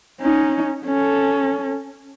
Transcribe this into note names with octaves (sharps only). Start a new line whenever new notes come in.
C#4 D#4
C#4 A4